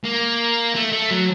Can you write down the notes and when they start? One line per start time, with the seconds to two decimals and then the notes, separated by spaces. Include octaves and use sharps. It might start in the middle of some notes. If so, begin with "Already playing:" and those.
0.05 A#3
0.76 A3
0.92 A3
1.11 F#3